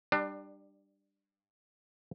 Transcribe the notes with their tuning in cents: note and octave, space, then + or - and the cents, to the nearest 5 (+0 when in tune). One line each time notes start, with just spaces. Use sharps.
G3 +0 D4 +25